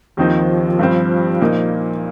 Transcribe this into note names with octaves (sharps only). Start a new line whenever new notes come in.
D#2 D#3 F3 C4 D#4
G2 G3 C4
A#2 A#3 D#4